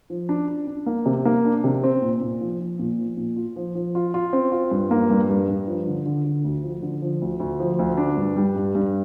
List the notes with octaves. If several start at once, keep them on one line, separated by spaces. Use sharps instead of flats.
F3
D4
D4
D4
A#3
C3
A#3
D4
C3
C4
A#2
A#2
F3
F3
A#2
F3
A#2
F4
F3
F3
F4
F4
C4
F4
G2
A#3
G2
G2
G2
F3
D3
D3
D3
D2
F3
D3
F3
D2
D2
F3
D2
D4
G2
G3
G2
G2